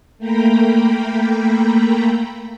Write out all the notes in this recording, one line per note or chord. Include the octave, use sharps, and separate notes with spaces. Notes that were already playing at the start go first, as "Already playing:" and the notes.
A3 A#3 G5 A#5 B5